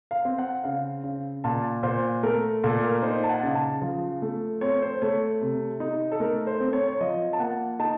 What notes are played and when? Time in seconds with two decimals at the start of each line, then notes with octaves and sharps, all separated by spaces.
0.11 F5
0.25 C4
0.38 F#5
0.64 C#3 F5
1.04 C#3
1.44 A#2 A5
1.83 A#2 C5
2.23 A3 A#4
2.64 A#2 A4
2.83 A#4
3.02 D#4 C5
3.24 A5
3.29 F#5
3.43 C#3
3.55 A5
3.82 F3
4.22 A3
4.61 C4 C#5
4.82 C5
5.02 A3 C#5
5.41 C3
5.80 D#4
6.12 A4
6.20 A3 A#4
6.47 C5
6.60 C4
6.73 C#5
6.88 C#5
7.01 F3 D#5
7.33 A5
7.39 A#3 F#5
7.79 D#4 A5